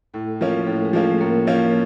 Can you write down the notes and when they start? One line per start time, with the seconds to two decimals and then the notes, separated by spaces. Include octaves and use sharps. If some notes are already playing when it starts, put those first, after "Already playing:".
0.14 A2 A3 A4
0.41 F3 A#3 C#4
0.63 A#4
0.67 A2 A3 A4
0.85 G#3 G#4
0.93 F3 A#3 C#4
1.03 A3 A4
1.21 A2 A#3 A#4
1.47 F3 A#3 C#4